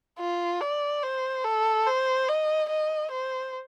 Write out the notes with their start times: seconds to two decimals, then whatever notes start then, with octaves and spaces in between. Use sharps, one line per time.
0.19 F4
0.61 D5
1.03 C5
1.45 A4
1.86 C5
2.28 D#5
2.70 D#5
3.11 C5